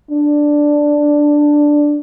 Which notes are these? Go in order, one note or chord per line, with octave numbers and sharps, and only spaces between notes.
D4